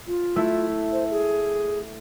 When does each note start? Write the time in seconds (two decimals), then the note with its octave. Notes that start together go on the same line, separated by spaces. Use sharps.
0.07 F4
0.36 A3 E4
0.92 C5
1.11 G#4